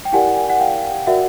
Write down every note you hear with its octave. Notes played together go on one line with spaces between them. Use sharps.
G5
E4 G4 A#4 D5 F#5 G#5
F#5
F5 G5
F#4 A#4 D5 E5 F#5